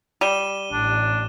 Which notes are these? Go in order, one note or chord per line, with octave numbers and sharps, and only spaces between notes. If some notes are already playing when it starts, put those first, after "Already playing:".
G3 D#7 E7 G7
A1 D4